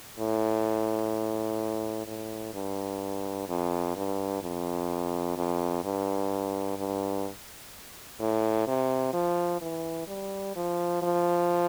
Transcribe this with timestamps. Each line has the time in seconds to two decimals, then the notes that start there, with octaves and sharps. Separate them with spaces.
0.19 A2
2.07 A2
2.54 G2
3.48 F2
3.96 G2
4.42 F2
5.37 F2
5.84 G2
6.78 G2
8.20 A2
8.67 C3
9.13 F3
9.61 E3
10.08 G3
10.56 F3
11.02 F3